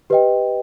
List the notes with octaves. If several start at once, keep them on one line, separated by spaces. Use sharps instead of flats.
G4 B4 D#5 G5